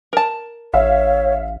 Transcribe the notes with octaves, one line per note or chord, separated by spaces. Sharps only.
A#4 A5
A1 C#5 E5 F5